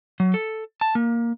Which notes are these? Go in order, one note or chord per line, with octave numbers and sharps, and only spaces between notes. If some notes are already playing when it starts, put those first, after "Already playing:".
F#3
A4
A5
A#3